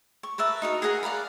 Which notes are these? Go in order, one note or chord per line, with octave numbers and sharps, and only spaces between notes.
C#6
A#4 B4 E5 A5
D#4 F#4 A#4
G#4 A#4 F#5 A#5
D5 F5 F#5 B5